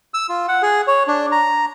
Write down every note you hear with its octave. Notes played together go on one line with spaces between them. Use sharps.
E6
F4
F#5
G#4
C#5
D4
A#5